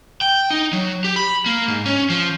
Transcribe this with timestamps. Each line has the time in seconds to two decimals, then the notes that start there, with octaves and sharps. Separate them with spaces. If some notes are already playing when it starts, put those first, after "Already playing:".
0.21 G5
0.50 D#4
0.73 F#3
1.04 G4
1.16 B5
1.46 A#3
1.68 G#2
1.86 C#4
2.10 F3